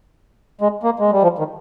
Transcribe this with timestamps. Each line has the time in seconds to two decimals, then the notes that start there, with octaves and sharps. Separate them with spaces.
0.61 G#3
0.83 A#3
0.99 G#3
1.11 G3
1.23 F3
1.39 D#3